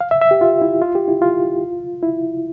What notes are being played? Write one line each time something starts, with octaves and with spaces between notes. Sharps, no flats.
F5
E5
E5
G4
F4
E4
F4
G4
E4
F4
E4